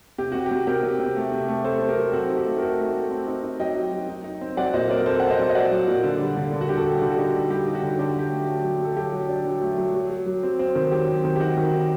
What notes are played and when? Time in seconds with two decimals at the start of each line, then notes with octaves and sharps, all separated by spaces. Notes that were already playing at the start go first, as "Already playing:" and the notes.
0.18 C3 G4
0.32 C3 F#4
0.46 G4
0.51 C3
0.67 C3 G4 A#4
0.83 C3
1.00 C3
1.16 A3
1.32 C3
1.48 A3
1.64 C3 A4 C5
1.81 C3
1.89 G4 A#4
1.97 F#3
2.13 C4 F#4 A4
2.29 D#4
2.38 G4
2.46 A3
2.58 A#4
2.62 D#4 F#4 A4
2.79 A3
2.95 A3
3.11 C4
3.27 D#4
3.43 D#4
3.60 F#3 D#5 G5
3.76 D#4
3.93 F#3
4.09 D#4
4.24 D#4
4.41 C4
4.57 F#3 D5 F#5
4.73 A#2 C5 D#5
4.90 C4 A#4 D5
5.06 C4 A4 C5
5.20 C4 F#5
5.30 C5 D#5
5.39 F#3
5.49 D#5
5.55 F#3 D5 F#5
5.71 F#3
5.88 A#2
6.04 D3
6.19 G3
6.37 D3
6.53 D3
6.61 F#4
6.69 G3 G4
6.77 F#4 A4
6.85 G3
7.01 D3 G4
7.10 F#4
7.18 D#4 G4
7.34 G3
7.50 G3 G4
7.67 D#4
7.75 F#4
7.82 D3
7.99 D4 G4
8.08 F#4
8.15 F#3 G4
8.31 A3
8.47 F#3
8.64 F#3
8.80 F#3 A4
8.96 F#3 G4
9.13 F#3
9.29 D4
9.45 F#3
9.61 A3
9.78 F#3
9.94 F#3
10.10 F#3
10.26 F#3
10.43 C4
10.59 C4
10.75 D#3
10.91 F#3 G4
11.08 C4
11.24 D#3
11.36 G4
11.40 D#4 F#4
11.57 D#3
11.73 D#4